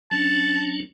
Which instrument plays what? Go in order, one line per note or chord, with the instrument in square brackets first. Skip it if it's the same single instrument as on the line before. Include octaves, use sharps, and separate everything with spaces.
[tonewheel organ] F#3 C#4 D4 [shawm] A5